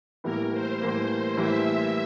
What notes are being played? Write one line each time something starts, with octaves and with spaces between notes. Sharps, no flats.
A2 E3 G3 A#3 A#4
C5
A2 E3 G3 A#3
A2 E3 G3 A#3 E5